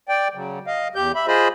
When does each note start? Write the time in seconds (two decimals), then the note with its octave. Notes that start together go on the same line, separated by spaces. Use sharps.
0.08 D5 G5
0.35 C#3 F#3
0.67 D#5 F5
0.95 E2 G4 G6
1.15 E5 B5
1.27 F4 G#4 C5 D#5 B5